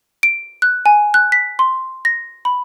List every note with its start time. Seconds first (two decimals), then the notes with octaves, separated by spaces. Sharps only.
0.23 D7
0.62 F#6
0.86 G#5
1.14 F#6
1.32 B6
1.59 C6
2.05 A#6
2.45 B5